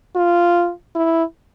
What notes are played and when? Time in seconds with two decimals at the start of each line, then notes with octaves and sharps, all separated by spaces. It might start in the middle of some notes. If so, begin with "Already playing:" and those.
0.16 F4
0.95 E4